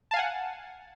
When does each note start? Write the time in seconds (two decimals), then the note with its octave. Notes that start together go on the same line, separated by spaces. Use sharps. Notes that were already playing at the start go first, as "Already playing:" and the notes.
0.11 A5
0.14 F5
0.16 G#5
0.19 F#5